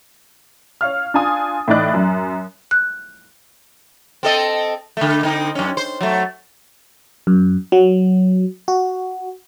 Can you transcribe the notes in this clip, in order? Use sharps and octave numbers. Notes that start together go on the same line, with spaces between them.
C#5 F5 F6
D4 F4 G#5 D#6
A2 E3 D#4 D5 F#6
F#2
F#6
C4 A4 D#5
D3 A3
D3 C4 D#4
F#2 C#4
C5
F#3 A3
F#2
F#3
F#4